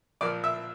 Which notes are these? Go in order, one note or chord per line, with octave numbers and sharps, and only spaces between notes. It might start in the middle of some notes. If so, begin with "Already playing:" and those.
A#1 A#2 F3 D5
E5